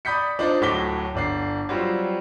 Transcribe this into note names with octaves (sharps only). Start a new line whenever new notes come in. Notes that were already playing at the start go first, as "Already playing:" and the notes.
D5 B5 D#6 G6 B6 C#7
D4 D#4 F4 C5 D5
D1 A2 F#3 D6 B6 G7
G1 D4 C7
F#3 G3 C4 F4